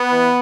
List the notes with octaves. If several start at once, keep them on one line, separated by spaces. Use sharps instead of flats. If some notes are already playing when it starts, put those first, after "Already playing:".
Already playing: B3
E3